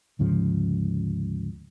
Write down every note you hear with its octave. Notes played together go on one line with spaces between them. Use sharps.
D2 G#2 C#3 F3